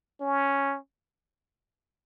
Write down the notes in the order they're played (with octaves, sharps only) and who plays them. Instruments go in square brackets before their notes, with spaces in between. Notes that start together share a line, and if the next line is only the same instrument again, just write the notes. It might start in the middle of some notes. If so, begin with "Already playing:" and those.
[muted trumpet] C#4